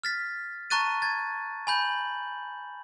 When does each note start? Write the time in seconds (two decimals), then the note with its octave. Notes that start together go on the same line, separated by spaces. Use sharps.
0.04 F6 A6 B6
0.70 A5 A#5 C#6 F#6 A6 D#7
1.02 G#6 A6
1.67 G#5 B5 G6 F#7